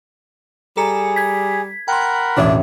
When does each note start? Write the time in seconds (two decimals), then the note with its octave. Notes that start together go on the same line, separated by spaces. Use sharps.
0.77 G3 G#4 A4 A#5 C#7
1.16 G#6 B6
1.88 A#4 F#5 G5 B5 C6
2.37 E1 A1 D4 E5